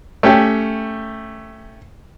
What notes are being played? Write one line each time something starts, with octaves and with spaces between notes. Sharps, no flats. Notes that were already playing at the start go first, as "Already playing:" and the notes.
A3 C#4 G4